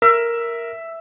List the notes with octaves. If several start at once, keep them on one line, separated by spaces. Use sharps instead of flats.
A#4 E5